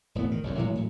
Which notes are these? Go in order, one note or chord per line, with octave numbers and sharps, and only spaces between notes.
E1 A2 E3 B3
D#3
F#1 C2 F#2
A2 E3 F#3 G#3
A2 F#3